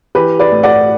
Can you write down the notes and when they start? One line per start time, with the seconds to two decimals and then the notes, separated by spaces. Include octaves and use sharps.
0.15 E3 G4 B4
0.39 B4 D5
0.52 A2
0.63 D5 F#5